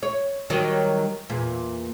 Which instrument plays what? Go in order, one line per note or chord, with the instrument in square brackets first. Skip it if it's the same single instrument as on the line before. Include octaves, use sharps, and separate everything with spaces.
[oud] C#5
D#3 F#3 G3
E2 A#2